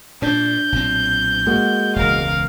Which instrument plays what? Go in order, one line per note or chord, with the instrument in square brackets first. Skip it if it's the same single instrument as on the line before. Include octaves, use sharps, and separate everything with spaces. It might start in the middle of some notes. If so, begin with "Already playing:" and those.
[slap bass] A#2 [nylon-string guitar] D4 [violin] G6
[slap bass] B1 A#2 C4
[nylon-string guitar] G#3 A#3 F#4
[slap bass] E1 C#2 [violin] A#4 F5